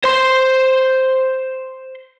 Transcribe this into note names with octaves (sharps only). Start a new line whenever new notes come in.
C5 C6